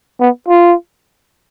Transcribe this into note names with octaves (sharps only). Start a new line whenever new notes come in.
B3
F4